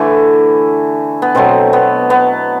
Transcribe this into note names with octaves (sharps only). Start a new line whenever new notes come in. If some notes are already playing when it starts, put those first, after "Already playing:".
Already playing: D3 E3 A3 E4
B3
B2 F#3 A3 C4
B3
B3